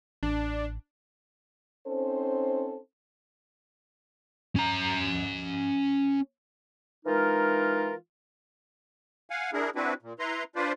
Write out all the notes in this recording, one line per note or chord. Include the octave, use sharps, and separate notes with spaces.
A1 D4
C4 C#4 D#4 A4 C5
C#4 A#5
E3 G#3 D#4 F4 A#4
F5 F#5 G#5
D4 E4 G#4 A#4
C4 D4 E4 F#4 B4
A#2
E4 B4 A#5 C6
D4 F4 B4 C5 D5